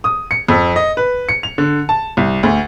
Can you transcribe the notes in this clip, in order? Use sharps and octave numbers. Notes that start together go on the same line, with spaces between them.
D#6
C#7
F2
D#5
B4
C#7
F7
D3
A5
C2
D2